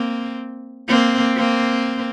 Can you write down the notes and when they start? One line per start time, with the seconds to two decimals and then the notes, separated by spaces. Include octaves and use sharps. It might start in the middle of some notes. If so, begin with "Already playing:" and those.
Already playing: A#3 C4
0.88 A#3 C4
1.36 A#3 C4